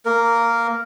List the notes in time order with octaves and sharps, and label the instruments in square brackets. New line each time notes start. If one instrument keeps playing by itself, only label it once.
[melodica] A#3 A#4